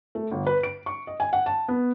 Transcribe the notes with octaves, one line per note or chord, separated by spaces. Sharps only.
A3
G1
B4
D7
C#6
D#5
G#5
F#5
A5
B3